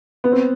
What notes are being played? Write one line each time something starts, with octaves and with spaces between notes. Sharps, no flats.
B3
C4